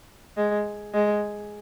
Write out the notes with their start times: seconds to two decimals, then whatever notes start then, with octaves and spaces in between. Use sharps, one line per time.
0.37 G#3
0.94 G#3